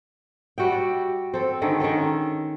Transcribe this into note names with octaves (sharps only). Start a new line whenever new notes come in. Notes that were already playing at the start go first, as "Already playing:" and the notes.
G3 F#4 E5 G5
D5
C4 A4
D3 D#3 G#3 A3
D#3 G#3 C#4 A4